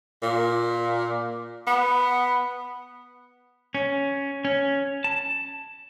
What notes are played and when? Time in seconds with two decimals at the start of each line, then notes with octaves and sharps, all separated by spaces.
0.23 A#2
1.67 B3
3.75 C#4
4.45 C#4
5.04 A5